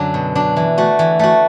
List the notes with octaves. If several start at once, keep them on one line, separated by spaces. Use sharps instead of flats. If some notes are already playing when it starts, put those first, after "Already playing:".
Already playing: F#2 D3 F#3 D4
B2
F#3 D4
E3
A3 F#4
E3
A3 F#4